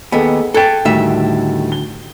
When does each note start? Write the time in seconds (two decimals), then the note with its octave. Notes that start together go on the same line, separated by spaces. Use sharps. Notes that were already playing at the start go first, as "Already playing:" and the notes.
0.12 D#2 B3 G#4 A4 D#5
0.54 A4 G5 F#6 G#6 A6
0.85 D2 A2 D#3 G3 E5
1.72 G7